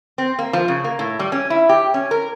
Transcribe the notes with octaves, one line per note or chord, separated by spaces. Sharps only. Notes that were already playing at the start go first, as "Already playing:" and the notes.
C4
A#3
F3
C#3
A#3
A2
G3
C#4
E4
G4
C#4
A#4